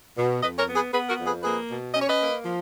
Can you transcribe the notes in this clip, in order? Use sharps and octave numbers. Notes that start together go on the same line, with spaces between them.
B2
F2 B4 D#5
A#4 C#5
B3
G#4 B4
B3 G#4 B4
F#4 A#4
F2
G#4 B4
A#3 G#4 B4
B2
C#4 D#5
C#5
B4 D#5
A#3
F3